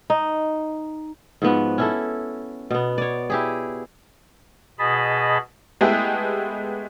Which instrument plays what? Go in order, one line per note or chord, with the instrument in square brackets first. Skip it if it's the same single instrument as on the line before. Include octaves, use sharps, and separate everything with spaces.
[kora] D#4
G#2 F3 B3 F#4
C#4 E4 A4
B2 B3
C#5 D5
E4 G4 G#4
[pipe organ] B2 G#4 D#5 A5 B5
[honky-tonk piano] G#3 A3 B3 E4 G4 G#4